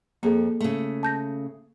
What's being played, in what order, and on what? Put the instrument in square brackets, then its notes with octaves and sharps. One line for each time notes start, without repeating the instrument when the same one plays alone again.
[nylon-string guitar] F2 [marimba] A#3 G#4 A4
[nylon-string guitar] C#3 A3
[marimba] A5 G6 A#6